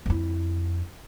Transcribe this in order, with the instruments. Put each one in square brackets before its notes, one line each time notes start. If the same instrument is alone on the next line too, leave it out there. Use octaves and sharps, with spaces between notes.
[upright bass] F2 E4